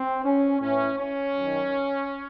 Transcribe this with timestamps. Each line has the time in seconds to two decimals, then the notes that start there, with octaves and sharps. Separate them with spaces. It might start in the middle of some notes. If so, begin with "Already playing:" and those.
Already playing: C4
0.23 C#4
0.60 A2 E3 C#4
0.97 C#4
1.35 F#2 D#3